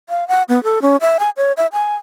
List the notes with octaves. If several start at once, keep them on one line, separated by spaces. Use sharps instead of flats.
F5
F#5
B3
A4
C#4
E5
G#5
C#5
E5
G#5